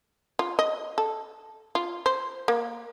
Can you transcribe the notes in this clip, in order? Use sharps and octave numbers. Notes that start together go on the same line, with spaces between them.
F4
D#5
A4
F4
C5
A#3